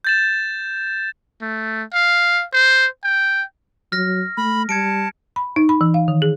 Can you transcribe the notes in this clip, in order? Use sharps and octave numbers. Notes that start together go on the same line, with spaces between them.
G6 A6 E7
A3
F5
C5
G5
F#3 F6 A#6
A3 B5
G3 A5 G#6 C#7 D7
B5
D#4
B5
E3
F5
D#3
G#4